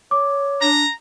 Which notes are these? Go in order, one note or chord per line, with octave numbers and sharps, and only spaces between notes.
C#5 D6
D4 A#5